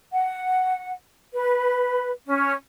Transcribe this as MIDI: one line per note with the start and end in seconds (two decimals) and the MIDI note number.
0.11 0.91 78
1.33 2.09 71
2.26 2.51 61